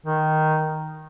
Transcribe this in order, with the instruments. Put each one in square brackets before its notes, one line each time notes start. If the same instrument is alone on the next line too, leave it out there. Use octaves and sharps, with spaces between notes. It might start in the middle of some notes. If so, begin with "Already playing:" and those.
[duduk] D#3